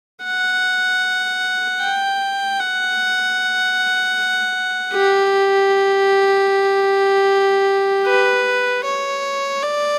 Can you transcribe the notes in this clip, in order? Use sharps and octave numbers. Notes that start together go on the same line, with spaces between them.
F#5
G5
F#5
G4
B4
C#5
D5